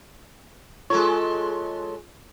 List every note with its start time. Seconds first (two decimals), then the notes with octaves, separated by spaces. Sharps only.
0.90 G#3 F4 A4 C#5 C#6